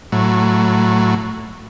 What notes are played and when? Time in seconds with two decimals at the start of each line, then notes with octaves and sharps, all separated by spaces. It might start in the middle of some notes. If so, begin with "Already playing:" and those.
0.12 A2 F#3